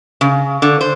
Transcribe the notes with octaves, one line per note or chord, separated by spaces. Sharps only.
C#3
D3
C5